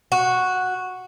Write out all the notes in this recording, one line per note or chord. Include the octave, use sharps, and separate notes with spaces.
F#4